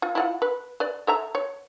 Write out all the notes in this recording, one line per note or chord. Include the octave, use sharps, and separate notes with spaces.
F4
E4 F4 F#5
B4
B4 D5
A4 E5 A#5
C#5